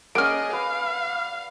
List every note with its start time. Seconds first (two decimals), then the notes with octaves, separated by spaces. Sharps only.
0.15 A#3 C#4 G#4 D5 D#5 F#5 F6 D7
0.53 B4 F5